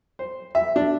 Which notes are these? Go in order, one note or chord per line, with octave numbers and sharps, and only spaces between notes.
C5
E5
D4